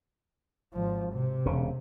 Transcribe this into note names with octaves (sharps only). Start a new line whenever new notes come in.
G#1 F3
C3
E1 C#3